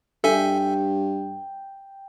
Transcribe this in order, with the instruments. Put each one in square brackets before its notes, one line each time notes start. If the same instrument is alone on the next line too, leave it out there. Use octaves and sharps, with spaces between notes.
[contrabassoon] G2 [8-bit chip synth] A4 E5 G#5 [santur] G5